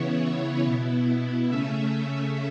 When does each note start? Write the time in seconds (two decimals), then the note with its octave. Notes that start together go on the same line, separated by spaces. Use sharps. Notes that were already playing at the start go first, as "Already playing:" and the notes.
Already playing: C#3 E3 B3 E4 C#5
0.23 C#5
0.64 B2 B3 E4
1.48 C#3 A3 C#4 E5
1.90 E5